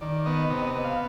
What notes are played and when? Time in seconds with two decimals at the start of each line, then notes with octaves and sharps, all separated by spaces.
0.01 D#3 D5
0.26 B3 D#5
0.50 C3 D#5
0.67 D#5
0.76 B3
0.84 F5